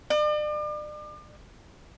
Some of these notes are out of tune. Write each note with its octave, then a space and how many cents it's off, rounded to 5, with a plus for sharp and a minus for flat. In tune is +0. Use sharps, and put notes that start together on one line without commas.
D5 +40